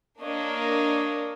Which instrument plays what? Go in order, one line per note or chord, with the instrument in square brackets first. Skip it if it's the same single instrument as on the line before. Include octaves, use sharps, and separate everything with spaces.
[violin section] A#3 D4 [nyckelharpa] C#5 D#5